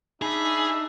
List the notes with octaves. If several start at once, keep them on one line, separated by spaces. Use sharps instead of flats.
D4 D#4 G#4 E5 B5